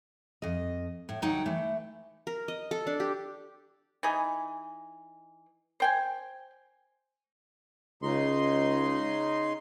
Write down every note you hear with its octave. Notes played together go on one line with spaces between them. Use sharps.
F2 D#5
A2
D2 F#3 D#4 F#5 G5
E3 A3
A#4
D#5
A4
D4
G4
E3 D#4 G#4
C5 G5 G#5
C#2 C#3 D#4 C6